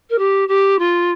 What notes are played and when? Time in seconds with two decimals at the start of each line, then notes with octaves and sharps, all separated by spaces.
0.10 A#4
0.18 G4
0.48 G4
0.79 F4